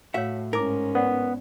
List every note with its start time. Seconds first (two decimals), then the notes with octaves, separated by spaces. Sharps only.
0.14 A2 F#4 C#5 E5 F5
0.53 G#2 C#4 D#4 E4 A#4 D6
0.95 B3 C5 D5 F#5